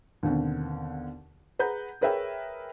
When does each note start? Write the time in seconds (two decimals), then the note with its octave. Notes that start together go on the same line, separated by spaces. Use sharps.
0.23 D#2 B2 D3 C4
1.59 G#4 B4 F#5 A#5 G6
2.01 G#4 A#4 B4 C#5 E5 G5